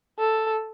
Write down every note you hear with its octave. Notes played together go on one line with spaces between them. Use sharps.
A4